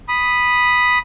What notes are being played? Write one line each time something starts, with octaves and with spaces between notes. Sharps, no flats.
B5 D#6